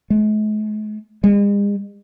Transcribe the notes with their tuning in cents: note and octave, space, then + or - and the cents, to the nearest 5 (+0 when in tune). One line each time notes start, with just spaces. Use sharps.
G#3 +45
G#3 -45